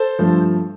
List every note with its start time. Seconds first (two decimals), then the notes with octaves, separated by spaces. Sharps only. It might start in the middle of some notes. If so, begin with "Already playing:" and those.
Already playing: A4 C5
0.19 G2 F3 A3